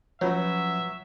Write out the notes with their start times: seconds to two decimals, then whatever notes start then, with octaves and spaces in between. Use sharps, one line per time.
0.21 F3 F#3 C#4 F4 B4 C#5 E5